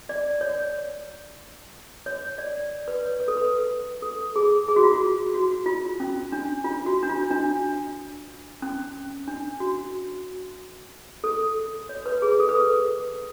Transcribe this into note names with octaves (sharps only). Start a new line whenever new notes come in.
D5
C#5
C#5
D5
B4
C#5
B4
A4
B4
A4
G#4
G#4
F#4
F4
F#4
F#4
F4
C#4
D4
F4
F#4
D4
F4
D4
C#4
D4
F#4
A4
C#5
B4
G#4
A4
B4
A4